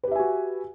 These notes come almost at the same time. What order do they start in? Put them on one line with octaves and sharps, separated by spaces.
B4 G4 E5 G#5 F#4